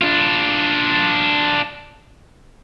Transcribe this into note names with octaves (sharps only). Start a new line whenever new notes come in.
D4 F4